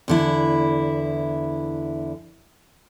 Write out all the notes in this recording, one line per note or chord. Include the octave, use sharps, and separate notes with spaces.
E2 D3 E4